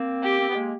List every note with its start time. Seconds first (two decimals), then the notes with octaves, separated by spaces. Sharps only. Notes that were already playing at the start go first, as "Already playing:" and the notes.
Already playing: A#3 C4
0.23 G4
0.40 C4
0.49 B3
0.55 G#3 A#3